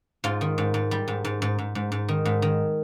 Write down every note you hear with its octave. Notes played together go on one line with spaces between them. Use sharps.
G#2 F4
D#3
G#2
G#2
G3
G#2
G#2
G#2
G#2
G#2
G#2
D#3
G#2
D#3